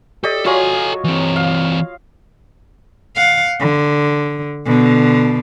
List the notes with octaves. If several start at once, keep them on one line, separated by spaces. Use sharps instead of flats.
G4 A4 D5 D#5
F#3 F4 A4 C#5 G#5
E3 C4
F5
F5 F#5
D3
B2 D3